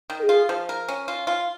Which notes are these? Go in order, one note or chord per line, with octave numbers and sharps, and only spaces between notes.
D#3
A#4
G#4
F4
F3
A#4
C#4
F4
F4